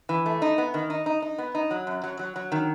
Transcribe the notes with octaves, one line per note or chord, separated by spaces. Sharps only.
E3
A3
D#4
B3
D#3
D#4
D#4
D#4
B3
D#4
F#3
F#2
F#3
F#3
F#3
D#3